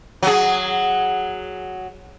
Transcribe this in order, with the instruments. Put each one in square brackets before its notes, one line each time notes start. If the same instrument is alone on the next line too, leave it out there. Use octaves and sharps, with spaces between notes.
[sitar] F#3 G#4